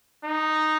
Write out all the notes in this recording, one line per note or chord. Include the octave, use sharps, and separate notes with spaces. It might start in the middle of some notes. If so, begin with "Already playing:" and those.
D#4